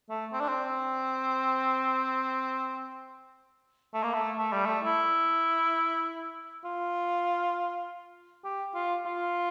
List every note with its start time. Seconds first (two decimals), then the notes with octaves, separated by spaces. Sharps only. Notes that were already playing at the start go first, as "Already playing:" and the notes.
0.10 A3
0.33 C4
0.40 D4
0.48 C4
3.94 A3
4.04 A#3
4.14 A3
4.38 A3
4.52 G3
4.65 A3
4.84 E4
6.65 F4
8.44 G4
8.75 F4
9.06 F4